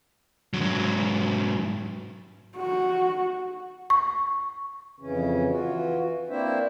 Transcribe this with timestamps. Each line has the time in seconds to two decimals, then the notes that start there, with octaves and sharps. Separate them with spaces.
0.54 G#2 F#3
2.57 F#4
3.90 C#6
5.00 F2 C#3 E3 C#4
5.49 E3 F4 F#4
6.29 A#3 C4 D4 E4 C5 E5